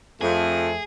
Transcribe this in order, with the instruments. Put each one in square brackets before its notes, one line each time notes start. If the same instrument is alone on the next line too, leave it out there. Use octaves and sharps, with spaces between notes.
[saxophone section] F2 [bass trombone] A3 [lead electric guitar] G#4